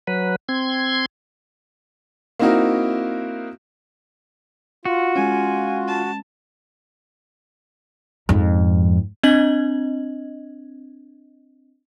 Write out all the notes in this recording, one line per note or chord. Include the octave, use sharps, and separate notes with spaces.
F#3 B4
C4 C6 G#6
A#3 C4 D#4 E4 F#4 A#4
F4 F#4
G#3 C#4 G#5
A5
F2 G#2
C4 D4 D#5 G#6 F#7